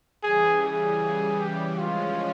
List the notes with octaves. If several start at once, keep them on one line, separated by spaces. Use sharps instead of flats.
C#3 E3 G3 G#4
G#4
G4
F3 G#3 C#4 F4